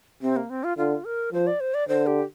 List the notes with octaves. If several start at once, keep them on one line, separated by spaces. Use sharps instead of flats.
C3 C4
A#3
C4
F4
D3 F4
A#4
F3 C5
D5
C5
D5
D3 C5
G4